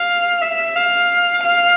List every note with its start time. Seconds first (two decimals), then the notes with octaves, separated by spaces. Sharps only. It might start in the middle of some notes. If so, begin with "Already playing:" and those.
Already playing: F5
0.41 E5
0.76 F5
1.44 F5